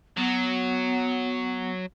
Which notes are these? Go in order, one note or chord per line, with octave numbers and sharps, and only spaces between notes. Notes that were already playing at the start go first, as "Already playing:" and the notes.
F#3 B3